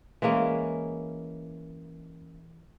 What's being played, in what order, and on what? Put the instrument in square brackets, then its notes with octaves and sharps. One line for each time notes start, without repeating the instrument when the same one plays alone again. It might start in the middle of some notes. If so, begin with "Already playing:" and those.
[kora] E3 G#3 A#3 C#4